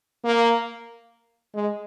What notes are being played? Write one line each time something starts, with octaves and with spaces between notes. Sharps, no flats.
A#3
G#3